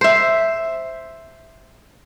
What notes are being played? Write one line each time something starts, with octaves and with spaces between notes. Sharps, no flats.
C5 E5